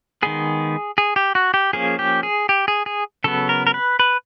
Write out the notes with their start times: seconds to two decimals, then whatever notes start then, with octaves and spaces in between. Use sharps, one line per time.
0.22 D#3 G#3 B3 G#4
0.98 G#4
1.16 G4
1.35 F#4
1.54 G4
1.73 F3 A#3 C#4 G#4
1.99 G4
2.23 G#4
2.49 G4
2.68 G#4
2.86 G#4
3.24 C#3 F#3 B3 A4
3.49 A#4
3.67 A#4
3.74 B4
4.00 B4